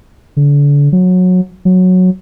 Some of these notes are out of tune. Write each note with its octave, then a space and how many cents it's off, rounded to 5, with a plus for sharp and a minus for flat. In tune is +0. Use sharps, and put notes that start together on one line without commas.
D3 -35
F#3 -20
F#3 -10